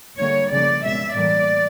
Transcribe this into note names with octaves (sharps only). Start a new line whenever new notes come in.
D3 G3 A#3 C#5
C#3 F3 A#3 D5
B2 G#3 E5
A2 E3 G3 A#3 D5